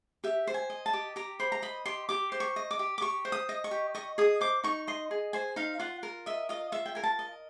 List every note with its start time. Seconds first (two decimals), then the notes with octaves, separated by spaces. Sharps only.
0.24 G4 E5
0.47 C5
0.54 G#5
0.70 D#5
0.86 A5
0.93 G4
1.16 G4 A#5
1.40 C5 B5
1.52 A#5
1.62 D#5 B5
1.86 G4 C6
2.09 G4 D6
2.32 C5
2.40 C#6
2.56 D#5
2.71 D6
2.79 G4
2.98 D6
3.01 G4 C#6
3.25 C5
3.32 D#6
3.49 D#5
3.64 C#6
3.71 G4
3.95 D#5 C#6
4.18 G#4 D#6
4.41 C5 D6
4.64 D#4 C#6
4.87 D#5 C6
5.11 G#4
5.33 C5 G#5
5.56 D#4 F5
5.79 F4 F#5
6.03 A#4
6.26 D#5 E5
6.49 F4 D#5
6.72 F4 E5
6.86 G5
6.95 A#4 G#5
7.04 A5
7.19 D#5